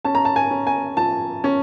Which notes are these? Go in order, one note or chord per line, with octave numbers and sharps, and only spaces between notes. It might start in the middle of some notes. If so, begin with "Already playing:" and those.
C#4 A5
A#5
A5
G#5
C#4
G#5
F3 A5
C#4